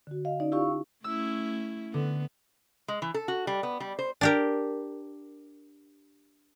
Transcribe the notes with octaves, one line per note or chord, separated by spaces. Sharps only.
D3 F#4
D#5 F5
C#4 D#4 D5
E4 F4 G4 F5 C#6
A3 C#4 E4 E6
D3 B3
G#3
E3
A4
F#4
G3
B3
G3
C5
D4 G4 A#4